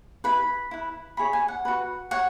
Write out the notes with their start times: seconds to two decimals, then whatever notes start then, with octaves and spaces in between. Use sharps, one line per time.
0.24 E4 B4 B5
0.71 E4 B4
1.17 E4 G#4 C#5 B5
1.33 G#5
1.48 F#5
1.65 F#4 B4
2.11 C#5 F#5